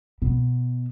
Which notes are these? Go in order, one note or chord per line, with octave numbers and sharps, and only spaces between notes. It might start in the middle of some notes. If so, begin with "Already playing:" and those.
B2